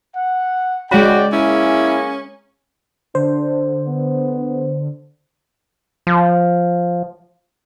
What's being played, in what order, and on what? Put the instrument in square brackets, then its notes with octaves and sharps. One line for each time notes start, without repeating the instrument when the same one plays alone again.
[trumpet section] F#5
[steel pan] G#3 B5 [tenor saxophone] C#4 [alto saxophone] F#4 [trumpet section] D5 F#5 G5
[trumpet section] A#3 G#4 [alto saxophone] C#4 [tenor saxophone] E4
[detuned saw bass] D3 [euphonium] D4 [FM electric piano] C5
[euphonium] B3
[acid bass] F3